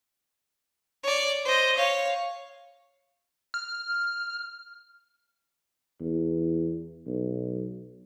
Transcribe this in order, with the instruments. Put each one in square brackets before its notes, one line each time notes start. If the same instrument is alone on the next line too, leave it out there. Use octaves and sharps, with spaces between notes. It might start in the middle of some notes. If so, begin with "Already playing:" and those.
[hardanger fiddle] C#5 D5
C5 D#5
C#5 F5
[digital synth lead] F6
[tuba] E2
B1